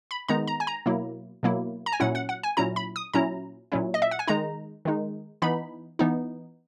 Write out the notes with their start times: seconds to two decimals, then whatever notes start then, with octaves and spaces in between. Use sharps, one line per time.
0.11 B5
0.28 D#3 G#3 B3 D#4 A#5
0.47 A#5
0.60 G#5
0.67 A#5
0.86 B2 F#3 A#3 E4
1.43 B2 F#3 A#3 E4
1.86 A#5
1.92 G#5
2.00 A#2 F#3 C#4 E4 F#5
2.15 F#5
2.29 F#5
2.43 G#5
2.57 A#2 F#3 C#4 E4 A#5
2.76 B5
2.96 D#6
3.14 A#2 F#3 C#4 E4 A#5
3.72 A#2 F#3 C#4 E4
3.94 D#5
4.02 E5
4.11 F#5
4.19 G#5
4.28 D#3 G#3 D#4 A#5
4.85 D#3 G#3 D#4
5.42 E3 B3 D#4 B5
5.99 E3 B3 D#4